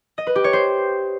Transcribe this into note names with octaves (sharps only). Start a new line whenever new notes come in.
D#5
B4
G4
C#5
C5